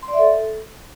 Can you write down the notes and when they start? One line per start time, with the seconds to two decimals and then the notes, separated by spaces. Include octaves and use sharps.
0.03 C6
0.08 D5
0.13 E5
0.19 A4